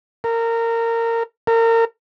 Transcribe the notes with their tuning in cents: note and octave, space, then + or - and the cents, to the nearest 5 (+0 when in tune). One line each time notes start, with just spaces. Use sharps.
A#4 -20
A#4 -30